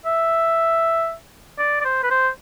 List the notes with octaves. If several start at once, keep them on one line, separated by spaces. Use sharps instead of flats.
E5
D5
D5
C5
B4
C5